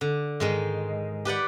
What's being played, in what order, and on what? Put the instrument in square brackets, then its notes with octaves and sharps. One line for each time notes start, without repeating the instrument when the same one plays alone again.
[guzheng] D3
G#2 D#3 G#3
G4 B4 D5 F#5